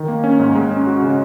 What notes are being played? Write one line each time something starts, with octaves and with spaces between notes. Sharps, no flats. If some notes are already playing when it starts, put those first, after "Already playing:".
Already playing: D#3
A#3
C#4
G#2
G#3
C#4
F#4
C#3